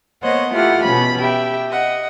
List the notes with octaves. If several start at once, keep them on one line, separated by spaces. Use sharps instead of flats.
A#3 B3 C5 C#5 D#5 F#5
A3 E4 F4 G4 F#5 F6
B2 C#4 B5
G4 E5 G5
D#5 F#5